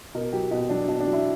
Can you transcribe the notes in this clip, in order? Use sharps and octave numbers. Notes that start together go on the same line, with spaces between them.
B2 A#4
F#3 G4
B2 F#4
F#3 D4
B2 D4
D4
F#3
E4